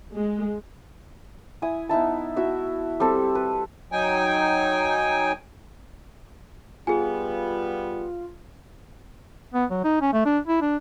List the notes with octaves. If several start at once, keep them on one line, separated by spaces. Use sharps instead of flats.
G#3
E4 G#5 D#6
B3 D#4 E4 A5
E4 F#4 E5
G3 C4 G4 A4
B4
F#3 D#4 G5 G#5
G3 B3 F4 G#4 G#5
B3
F#3
D#4
C#4
A3
D4
E4
D4